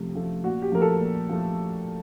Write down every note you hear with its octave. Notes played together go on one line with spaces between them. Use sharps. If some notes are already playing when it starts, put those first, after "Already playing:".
Already playing: C3 F3 A3
F3 A3
A#2 F#4
G4
F3 A3 A#4
A4
A#2
F3 A3